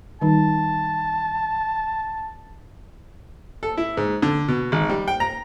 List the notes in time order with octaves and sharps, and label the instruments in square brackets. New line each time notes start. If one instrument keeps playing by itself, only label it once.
[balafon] D#3 G3 D#4 [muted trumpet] A5
[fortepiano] A4
E4
G#2
D3
B2
G#1
G3
G5
A#5